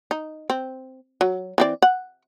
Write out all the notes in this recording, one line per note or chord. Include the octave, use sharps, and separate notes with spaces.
D#4
C4
F#3
E3 C4 D5
F#5